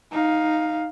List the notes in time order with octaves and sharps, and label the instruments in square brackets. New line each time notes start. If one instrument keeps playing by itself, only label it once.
[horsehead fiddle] D#4 F5